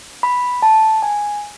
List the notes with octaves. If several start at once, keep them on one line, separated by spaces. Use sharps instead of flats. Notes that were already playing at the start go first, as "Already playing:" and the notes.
B5
A5
G#5